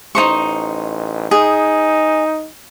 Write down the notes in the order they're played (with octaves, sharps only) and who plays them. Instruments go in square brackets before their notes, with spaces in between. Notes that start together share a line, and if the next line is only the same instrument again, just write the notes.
[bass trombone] A1 [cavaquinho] D#4 C5 C#6
[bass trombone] D#4 [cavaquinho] G#4